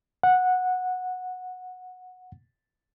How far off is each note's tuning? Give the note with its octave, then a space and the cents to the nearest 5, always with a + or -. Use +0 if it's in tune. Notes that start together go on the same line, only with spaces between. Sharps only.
F#5 -10